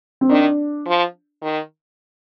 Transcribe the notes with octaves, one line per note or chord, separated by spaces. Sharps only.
C4
D#3 D4
F3
D#3